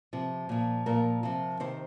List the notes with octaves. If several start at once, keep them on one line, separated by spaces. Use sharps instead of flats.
C3 F3
A#2 F3
A#2 F3 A#4
C3 F3
C3 D#3 C5